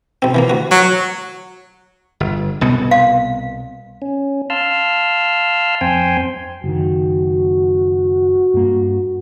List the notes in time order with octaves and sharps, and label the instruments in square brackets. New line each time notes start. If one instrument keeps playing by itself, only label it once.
[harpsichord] B1 C4
E3 F3 A#3
D2 F#4
[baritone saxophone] F#3
[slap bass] G1
C2 B2 B3
[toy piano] F5
[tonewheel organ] C#4
F5 A5 C6 E6 F6
F2 C4 G5 G#5 C6
[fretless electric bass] F#1 D#3 [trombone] F#4
[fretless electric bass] G2 A#3